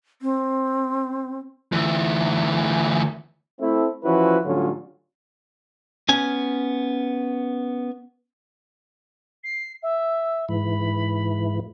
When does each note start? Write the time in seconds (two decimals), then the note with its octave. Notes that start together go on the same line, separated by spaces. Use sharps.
0.22 C4
1.72 D2 E3
3.60 A3 C4 E4
4.04 E3 F3 C#4 E4 F#4 B4
4.44 A2 D3 F#3 G3 C#4 F4
6.09 B3 C#4 G#5
9.44 C7
9.82 E5
10.49 G#2 E3 B5